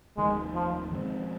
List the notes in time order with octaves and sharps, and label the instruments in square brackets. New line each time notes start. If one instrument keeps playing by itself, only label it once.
[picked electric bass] F1 D#2 D#3 [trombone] G#3
[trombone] F3
[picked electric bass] F2 D#3 G#3 C4